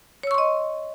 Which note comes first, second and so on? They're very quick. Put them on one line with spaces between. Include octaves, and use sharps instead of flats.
C#5 E6 C#6 C6 D#5